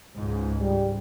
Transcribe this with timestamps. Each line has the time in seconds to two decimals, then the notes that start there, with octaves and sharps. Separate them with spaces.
0.15 C#2 G#2
0.59 G3